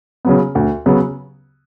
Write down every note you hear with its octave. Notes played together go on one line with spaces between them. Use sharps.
C#3 F#3 B3
D2
C#3 F#3 B3